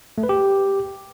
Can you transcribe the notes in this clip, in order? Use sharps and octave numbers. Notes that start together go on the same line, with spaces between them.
A3
B4
G4